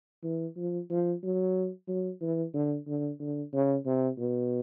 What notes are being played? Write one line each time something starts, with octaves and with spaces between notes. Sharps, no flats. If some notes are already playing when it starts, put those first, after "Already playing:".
E3
F3
F3
F#3
F#3
E3
D3
D3
D3
C#3
C3
B2